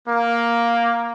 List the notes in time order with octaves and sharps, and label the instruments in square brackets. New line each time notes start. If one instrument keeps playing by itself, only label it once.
[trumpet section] A#3